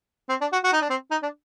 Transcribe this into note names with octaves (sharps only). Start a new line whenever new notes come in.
C4
D4
F#4
F#4
D#4
D4
C4
D#4
D4